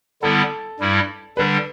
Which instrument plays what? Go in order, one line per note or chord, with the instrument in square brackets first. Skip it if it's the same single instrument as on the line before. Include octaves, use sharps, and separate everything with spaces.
[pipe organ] D3 G3 B3 E4 [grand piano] A4
[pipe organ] G2 G3 E4
[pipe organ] D3 G3 D4 [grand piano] B4